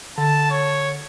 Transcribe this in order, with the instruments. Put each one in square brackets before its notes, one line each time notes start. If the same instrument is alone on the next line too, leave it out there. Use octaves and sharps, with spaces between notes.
[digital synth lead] D3 [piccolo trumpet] A5
[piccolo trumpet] C#5